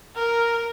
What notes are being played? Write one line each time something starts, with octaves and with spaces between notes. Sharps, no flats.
A#4